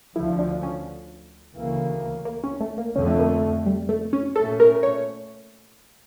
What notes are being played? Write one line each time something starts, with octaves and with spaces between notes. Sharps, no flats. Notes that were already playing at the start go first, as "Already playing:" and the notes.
D2 D3 F3 E4
D4
C#4
D2 C#3 E3 A#3
A#3
C#4
A3
A#3
F2 D3 A3 C#4
A#3
G3
A3
C#4
A#2 A3 C#4 A4
A#4
C#5